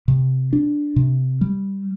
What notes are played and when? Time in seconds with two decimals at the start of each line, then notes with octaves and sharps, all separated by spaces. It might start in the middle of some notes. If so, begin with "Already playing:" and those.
0.08 C3
0.53 D4
0.96 C3
1.41 G3